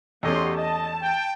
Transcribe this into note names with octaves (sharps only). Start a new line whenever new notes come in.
E2 A3 C#4 F#4 G4 C#5 D#5 C6
D#5 A5
G5